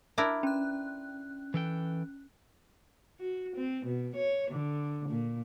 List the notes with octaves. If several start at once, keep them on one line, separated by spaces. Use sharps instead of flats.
D4 E4 A#4
C#4 F#6
E3 A4 G5
F#4
C4
B2
C#5
D3
A#2